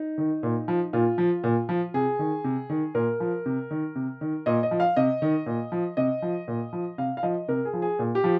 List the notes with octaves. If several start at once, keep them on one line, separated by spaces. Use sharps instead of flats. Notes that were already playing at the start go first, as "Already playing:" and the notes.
Already playing: D#4
D#3
A#2
F3
A#2 F4
F3
A#2
F3
C3 G#4
D#3
C3
D#3
A#2 A#4
F3
C3
D#3
C3
D#3
A#2 D#5
D#5
F3
F5
C3 D#5
D#3
A#2
F3
C3 D#5
F3
A#2
F3
C3 F5
F5
F3 D#5
C3 A#4
G#4
F3
G#4
A#2
G4
F3